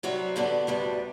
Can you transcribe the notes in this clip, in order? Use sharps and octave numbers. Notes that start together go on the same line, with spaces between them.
C3 F#3 G3 C4 F#4
G2 D3 G3 B3 D4
D2 C3 G3 B3 D4